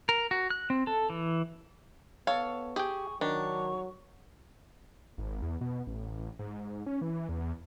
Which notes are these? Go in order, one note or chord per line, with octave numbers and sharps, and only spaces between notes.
A#4
F#4
F#6
C4
A4
E3
B3 A4 C#5 F5
G4 G#4 G5 C#6
D#3 F#3 D4 C#6
G#1
E2
B2
A1
G#2
C#4
E3
E2